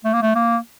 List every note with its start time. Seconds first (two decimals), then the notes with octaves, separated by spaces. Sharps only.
0.05 A3
0.14 A#3
0.22 A3
0.35 A#3